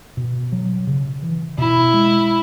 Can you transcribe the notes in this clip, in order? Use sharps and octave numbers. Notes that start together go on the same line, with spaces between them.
B2
F#3
C#3
E3
B2 E4
G#3